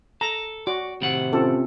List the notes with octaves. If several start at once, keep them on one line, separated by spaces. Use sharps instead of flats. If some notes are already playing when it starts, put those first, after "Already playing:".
A4 A#5
F#4 D5
A2 C3 D#3 F#5
C4 C#4 F4 A4